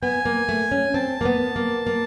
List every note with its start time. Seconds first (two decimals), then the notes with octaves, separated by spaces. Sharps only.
0.03 B3 G#5
0.25 A#3
0.49 A3
0.72 C#4
0.94 C4 A5
1.21 A#3
1.25 B3
1.56 A#3
1.87 A#3